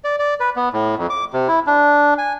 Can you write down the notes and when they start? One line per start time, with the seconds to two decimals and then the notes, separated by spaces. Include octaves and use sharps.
0.04 D5
0.19 D5
0.40 B4
0.56 B3
0.73 A2
0.98 F2
1.10 D6
1.33 C3
1.48 E4
1.67 D4
2.18 G#5